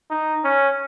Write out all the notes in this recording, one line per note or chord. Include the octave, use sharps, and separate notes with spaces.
D#4
C#4